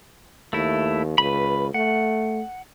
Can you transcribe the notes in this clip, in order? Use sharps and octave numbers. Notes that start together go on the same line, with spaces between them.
D#2 A3 E4
C#2 B4 B5
A3 F#5